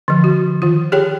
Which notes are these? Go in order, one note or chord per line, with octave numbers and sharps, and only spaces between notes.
D3 F3
F#4
D#3 F4
G4 G#4 C#5 G5